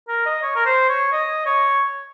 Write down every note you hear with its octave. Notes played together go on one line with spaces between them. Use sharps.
A#4
D#5
C#5
A#4
C5
C#5
D#5
C#5